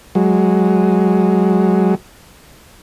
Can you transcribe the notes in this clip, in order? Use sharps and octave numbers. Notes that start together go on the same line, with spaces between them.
F#3 G#3